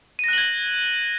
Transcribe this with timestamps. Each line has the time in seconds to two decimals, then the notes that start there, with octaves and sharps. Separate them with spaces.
0.19 D#7
0.24 A#6
0.28 F#6
0.33 F#7
0.38 G#6